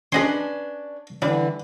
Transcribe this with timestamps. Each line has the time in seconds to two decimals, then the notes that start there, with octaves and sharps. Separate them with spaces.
0.12 C#4 D4 G#4 B4 D#5 C6
1.22 D3 E3 G3 D4